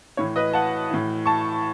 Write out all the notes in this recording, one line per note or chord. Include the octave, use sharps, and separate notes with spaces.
A2 E3 C#5
B4 D#5
F#5 A5
A2 E3
A5 C#6